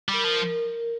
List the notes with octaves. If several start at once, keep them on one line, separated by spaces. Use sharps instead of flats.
G3
A#4
F3
A#4